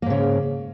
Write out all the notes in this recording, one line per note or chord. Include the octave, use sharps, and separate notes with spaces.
G#2 C#3 A#3